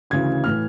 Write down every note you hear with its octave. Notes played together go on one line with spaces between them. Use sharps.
D2 C#3 E3 G#6
A2 E3 F6